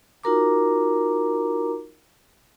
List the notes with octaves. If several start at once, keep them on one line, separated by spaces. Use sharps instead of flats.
D#4 F4 F#4 A#4 A#5 D6